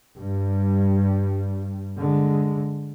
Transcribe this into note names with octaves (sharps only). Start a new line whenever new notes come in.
G2 G3
D3 G#3